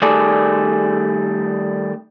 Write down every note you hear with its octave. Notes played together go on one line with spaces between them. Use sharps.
D#3 G3 A3 G#4 A4 D5